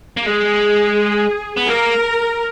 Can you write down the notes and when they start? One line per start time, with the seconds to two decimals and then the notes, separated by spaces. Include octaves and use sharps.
0.17 A#3
0.26 G#3 G#4
1.57 B3
1.68 A#3 A#4